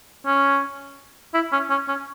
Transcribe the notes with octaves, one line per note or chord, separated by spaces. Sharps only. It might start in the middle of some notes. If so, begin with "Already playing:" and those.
C#4
E4
C#4
C#4
C#4